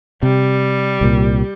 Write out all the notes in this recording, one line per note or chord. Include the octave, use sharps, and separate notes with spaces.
C3 G3
C2 A#2